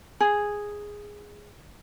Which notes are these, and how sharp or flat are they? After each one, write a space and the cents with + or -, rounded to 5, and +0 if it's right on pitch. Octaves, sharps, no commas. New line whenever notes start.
G#4 -5